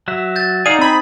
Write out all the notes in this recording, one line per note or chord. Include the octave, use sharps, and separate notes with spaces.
F#3 F#4 E5
G6 A6
D#4 G#4 D5 F5 F#5 D#7
C4 G#4 B5